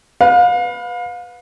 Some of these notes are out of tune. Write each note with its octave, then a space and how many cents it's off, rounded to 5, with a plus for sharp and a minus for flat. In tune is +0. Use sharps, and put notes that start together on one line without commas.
B4 +0 F5 +35